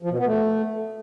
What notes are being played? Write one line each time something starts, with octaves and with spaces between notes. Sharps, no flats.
F3
B2
B3
A3